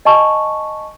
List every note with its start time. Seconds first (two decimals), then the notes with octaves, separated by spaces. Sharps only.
0.05 D#5 G#5 A5 C#6